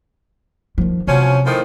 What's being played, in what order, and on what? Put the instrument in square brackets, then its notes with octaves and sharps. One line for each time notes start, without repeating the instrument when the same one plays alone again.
[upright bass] D#3 F3
[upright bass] C3 [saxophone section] F3 F#3 C#4
[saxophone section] A2 D#3 F3